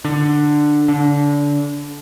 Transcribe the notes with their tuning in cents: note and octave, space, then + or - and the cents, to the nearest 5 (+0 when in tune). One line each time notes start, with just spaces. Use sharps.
D3 +10
D3 -25